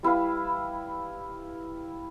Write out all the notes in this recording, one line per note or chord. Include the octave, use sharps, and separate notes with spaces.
G3 E4 B4 F5